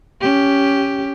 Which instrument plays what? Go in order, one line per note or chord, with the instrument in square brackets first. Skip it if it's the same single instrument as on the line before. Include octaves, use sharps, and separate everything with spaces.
[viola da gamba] C#4 G4